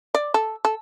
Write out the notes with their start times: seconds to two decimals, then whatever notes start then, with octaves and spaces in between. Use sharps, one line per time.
0.14 D5
0.34 A4
0.65 A4